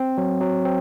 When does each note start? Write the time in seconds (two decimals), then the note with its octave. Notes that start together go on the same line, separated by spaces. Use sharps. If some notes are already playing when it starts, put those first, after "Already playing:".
Already playing: C4
0.18 F#3
0.41 F#3
0.65 C4